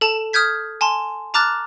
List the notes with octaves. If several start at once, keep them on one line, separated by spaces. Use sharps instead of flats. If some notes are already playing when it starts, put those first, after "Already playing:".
A4 A5 E7 F7
D#6 F6 G6 G#6 B6
G#5 A5 C6
A5 A#5 D6 F6 F#6 A6